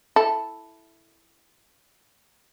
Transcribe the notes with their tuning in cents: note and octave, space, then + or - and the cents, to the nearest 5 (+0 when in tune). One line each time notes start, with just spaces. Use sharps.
E4 +0 A4 -5